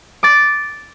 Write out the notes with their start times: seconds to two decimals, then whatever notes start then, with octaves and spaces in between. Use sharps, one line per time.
0.23 D6 A6